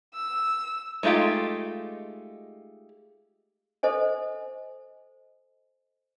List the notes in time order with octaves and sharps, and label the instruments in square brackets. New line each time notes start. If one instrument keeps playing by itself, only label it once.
[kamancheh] E6
[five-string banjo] G#3 A3 D#4 F4 G4
[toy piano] A4 C5 D#5 G#5